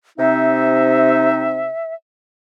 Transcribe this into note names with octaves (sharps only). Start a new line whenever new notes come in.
C3 C4 D#4 E5